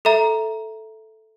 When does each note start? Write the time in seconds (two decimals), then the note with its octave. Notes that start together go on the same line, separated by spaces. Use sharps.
0.05 A4 E5 A#5